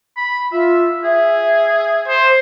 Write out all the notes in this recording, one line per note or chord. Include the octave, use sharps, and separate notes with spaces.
B5
F4 E5
G#4 E5
C5